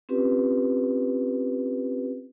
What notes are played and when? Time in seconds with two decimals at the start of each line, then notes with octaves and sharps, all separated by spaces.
0.09 C4 C#4 F4 G4 B4